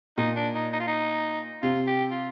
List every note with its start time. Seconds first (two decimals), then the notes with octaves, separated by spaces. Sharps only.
0.18 A#2 D#4
0.36 D4
0.55 D#4
0.73 D#4
0.80 F4
0.87 D#4
1.62 C3 F4
1.87 G4
2.11 F4